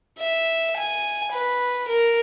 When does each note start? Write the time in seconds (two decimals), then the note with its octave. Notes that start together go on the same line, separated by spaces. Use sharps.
0.18 E5
0.77 G#5
1.32 B4
1.88 A#4